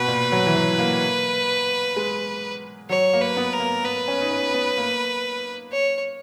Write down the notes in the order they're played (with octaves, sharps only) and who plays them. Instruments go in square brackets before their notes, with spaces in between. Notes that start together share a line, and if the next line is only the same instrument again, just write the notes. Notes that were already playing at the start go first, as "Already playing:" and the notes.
Already playing: [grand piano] B2 A#3 [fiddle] B4
[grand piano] A#2
F#3
E3
F#3
A#3
G#3
[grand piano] F#3 [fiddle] C#5
[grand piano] A#3
[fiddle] B4
[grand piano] B3
[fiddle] A#4
[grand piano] A#3
[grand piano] B3 [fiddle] B4
[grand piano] C#4
D#4
C#4
B3
A#3
[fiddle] C#5